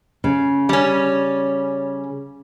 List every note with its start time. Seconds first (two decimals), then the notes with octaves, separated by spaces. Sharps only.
0.24 C#3
0.69 G3 C#4